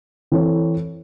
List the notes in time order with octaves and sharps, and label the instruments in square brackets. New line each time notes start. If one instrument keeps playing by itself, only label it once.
[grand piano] E3 C4 E4 A4 C#5